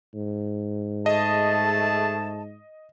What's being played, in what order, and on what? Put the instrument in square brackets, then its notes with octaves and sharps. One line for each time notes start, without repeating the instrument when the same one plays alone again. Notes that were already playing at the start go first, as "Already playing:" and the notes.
[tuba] G#2
[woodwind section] A3 G#4 A5 [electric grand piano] D#5